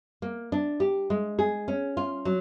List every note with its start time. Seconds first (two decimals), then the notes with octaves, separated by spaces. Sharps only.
0.22 A#3
0.52 D4
0.80 G4
1.10 G#3
1.39 G#4
1.68 C#4
1.97 F4
2.25 F#3